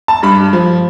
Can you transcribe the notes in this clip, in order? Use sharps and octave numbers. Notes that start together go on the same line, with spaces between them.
A5
G2 B5
F3